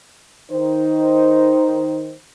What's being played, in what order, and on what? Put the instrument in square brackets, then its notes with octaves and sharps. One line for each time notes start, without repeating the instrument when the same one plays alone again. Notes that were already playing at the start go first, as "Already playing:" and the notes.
[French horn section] D#3 D#4 C5